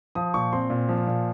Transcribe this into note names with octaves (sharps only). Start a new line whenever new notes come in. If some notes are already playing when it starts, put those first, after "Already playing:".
F3 D#6
A#2 C#6
C4 C6
A#2
F3
A#2